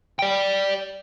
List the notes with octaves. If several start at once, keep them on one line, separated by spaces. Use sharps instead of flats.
D5 G5